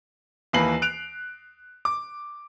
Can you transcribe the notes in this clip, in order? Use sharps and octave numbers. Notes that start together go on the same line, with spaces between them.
D#2 E3 A#3 B4 C7 F#7
F#6 D7 F7
D6